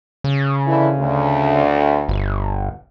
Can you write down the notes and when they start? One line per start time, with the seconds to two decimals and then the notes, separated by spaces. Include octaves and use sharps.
0.24 C#3
0.66 D3 E3 E4
0.98 D2
2.09 G1